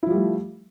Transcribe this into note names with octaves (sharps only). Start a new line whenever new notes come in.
F3 G3 A3 E4